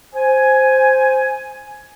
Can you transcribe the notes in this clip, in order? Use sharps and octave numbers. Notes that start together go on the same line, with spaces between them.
C5 G#5